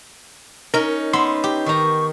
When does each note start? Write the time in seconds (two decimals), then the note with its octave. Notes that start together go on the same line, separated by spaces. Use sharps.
0.74 C#4 D#4 A#4
1.13 B3 E5 B5 C6
1.44 G4
1.66 D#3 A#5 C#6